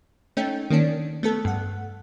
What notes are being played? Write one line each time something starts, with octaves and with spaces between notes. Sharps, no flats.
A3 C#4 D#4 G5
D#3 A#3 C#4 D4
A3 B3 A4
G2 F#5